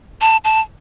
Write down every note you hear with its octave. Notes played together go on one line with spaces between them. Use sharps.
A5
A5